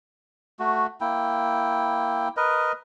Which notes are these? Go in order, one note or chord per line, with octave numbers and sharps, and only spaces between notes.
A3 F#4
A#3 E4 G5
A#4 B4 D#5